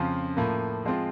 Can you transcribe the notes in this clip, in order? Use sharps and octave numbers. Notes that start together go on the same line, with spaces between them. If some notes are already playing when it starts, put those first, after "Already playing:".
Already playing: F2 C#3 F3
A2 F3 A#3
F3 G#3 C4 F4